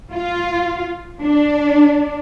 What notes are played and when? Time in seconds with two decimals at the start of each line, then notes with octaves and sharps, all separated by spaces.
0.13 F4
1.21 D4